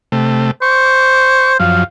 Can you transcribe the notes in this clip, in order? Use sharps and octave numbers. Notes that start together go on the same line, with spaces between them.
C3 A3
C5 C#6
F#2 F3 F5